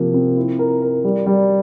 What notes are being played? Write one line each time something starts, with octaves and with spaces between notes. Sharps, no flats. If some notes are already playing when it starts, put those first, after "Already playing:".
Already playing: C3 F3 A#3
C4
E4
A#4
A#4
G3
G3